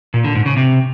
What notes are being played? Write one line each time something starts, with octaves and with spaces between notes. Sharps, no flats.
A#2
D3
G#2
C#3
C3